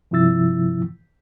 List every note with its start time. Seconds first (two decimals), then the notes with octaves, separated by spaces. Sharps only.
0.11 G2 C3 F3 E4 E6 A6